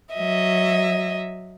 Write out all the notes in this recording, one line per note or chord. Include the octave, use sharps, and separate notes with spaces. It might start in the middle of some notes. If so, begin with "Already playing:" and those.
F#3 D#5 E5